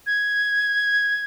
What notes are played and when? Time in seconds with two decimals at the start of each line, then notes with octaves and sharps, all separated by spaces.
0.06 G#6